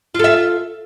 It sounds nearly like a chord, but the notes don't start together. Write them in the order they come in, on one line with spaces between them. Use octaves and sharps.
F4 A4 E5